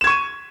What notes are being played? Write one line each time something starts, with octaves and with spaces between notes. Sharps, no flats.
C#6 G#6 D#7 E7